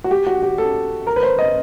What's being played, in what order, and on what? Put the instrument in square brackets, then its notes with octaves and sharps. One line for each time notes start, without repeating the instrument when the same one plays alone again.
[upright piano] F#4
G4
F#4
G4
A4
A#4
B4
C5
D#5